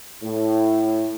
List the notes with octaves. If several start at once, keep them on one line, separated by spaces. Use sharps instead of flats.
A2